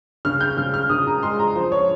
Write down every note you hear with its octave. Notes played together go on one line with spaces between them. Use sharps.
C#3 F6
G6
C#3 F6
F6
C#3 D#6
A#5
G#3 C6
A#5
F3 C5
C#5